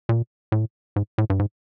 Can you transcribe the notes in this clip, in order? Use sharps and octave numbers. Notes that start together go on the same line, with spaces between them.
A#2
A2
G#2
A2
G2
G#2